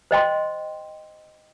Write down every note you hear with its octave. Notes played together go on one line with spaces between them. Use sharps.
C5 D#5 G5 C6